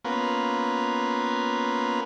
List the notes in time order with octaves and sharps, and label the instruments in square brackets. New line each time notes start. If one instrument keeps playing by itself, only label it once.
[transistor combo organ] A#3 B3 C#4 F4 A#4 B4